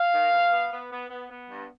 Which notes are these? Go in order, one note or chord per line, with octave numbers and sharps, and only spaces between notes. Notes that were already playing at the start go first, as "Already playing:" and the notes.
Already playing: F5
D#3
G2
B3
B3
B3
B3
B3
G2